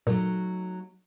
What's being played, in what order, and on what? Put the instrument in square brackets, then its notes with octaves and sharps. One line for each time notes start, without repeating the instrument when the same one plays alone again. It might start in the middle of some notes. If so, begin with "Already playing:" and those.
[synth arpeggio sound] A#2 [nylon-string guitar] F#3 A3 D#4